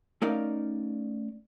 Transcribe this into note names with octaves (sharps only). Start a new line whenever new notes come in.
A3 C#4 D#4 A#4 D5 F5